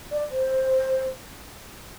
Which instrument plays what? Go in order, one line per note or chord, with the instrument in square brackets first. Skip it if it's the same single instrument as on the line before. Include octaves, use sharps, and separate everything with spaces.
[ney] D5
C5